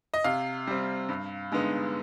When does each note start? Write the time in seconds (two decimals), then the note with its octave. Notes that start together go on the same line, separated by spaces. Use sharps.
0.14 D#5
0.24 C3 F5
0.67 G3 C4
1.09 G2
1.52 D3 G#3 B3 D#4